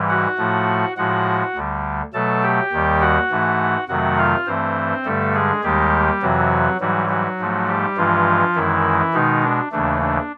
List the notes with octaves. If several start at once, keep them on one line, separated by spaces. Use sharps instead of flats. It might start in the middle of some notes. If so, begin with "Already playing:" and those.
Already playing: G#2 E3 G3
F#4 F#5
A2 F3 A3
A2 F3 G#3 F#4 F#5
D2 D3 G3
B2 F#3 A3 A4 A5
G4 G5
D#2 D#3 G3
F#4 F#5
G#2 E3 A3
F2 C3 D#3 F#3 A3 F#4 F#5
F4 F5
G2 E3 A3 C4 C5
G2 D3 G3 A3 A4
G#3 G#4
D#2 D#3 G3 G#3 G4
F2 C3 E3 F#3 F#4
G#2 E3 F#3 G3 F#4
F#3 F#4
G#2 F3 A3
G3 G4
G2 E3 F3 G#3 F4
F#2 D#3 E3 G#3 E4
B2 D#3 G#3 D#4
D4
D#2 C#3 E3 A3 D4
D4